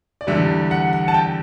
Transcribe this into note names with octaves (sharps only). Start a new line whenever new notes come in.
D5
E2 D3 G3 E5
F#5
F#5
A5
G5